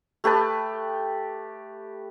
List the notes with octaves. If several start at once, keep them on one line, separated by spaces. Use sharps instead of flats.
A3 G4 B4 A5